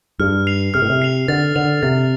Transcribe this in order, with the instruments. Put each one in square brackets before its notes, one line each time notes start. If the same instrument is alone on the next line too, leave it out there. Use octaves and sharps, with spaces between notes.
[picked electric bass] G2 [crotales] F6
[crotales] C7 F7
[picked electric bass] C3 [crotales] F6
[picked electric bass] A2
C3
[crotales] C7 F7
[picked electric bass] D3 [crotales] A6
[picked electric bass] D3 [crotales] F7
[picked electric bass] C3 [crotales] A6